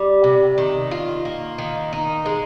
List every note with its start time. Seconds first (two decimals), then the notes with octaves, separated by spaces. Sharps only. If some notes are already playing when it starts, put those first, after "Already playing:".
Already playing: G3
0.24 C3
0.58 D#3
0.91 F4
1.25 A#3
1.58 D#3
1.93 D#4
2.26 G#3